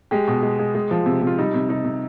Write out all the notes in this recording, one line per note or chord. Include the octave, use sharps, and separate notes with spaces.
G#3 G4
B2
G#3
G#3
G#3
F3
C3
C3
F4
G3 D#4
C3
C3 D#4
C3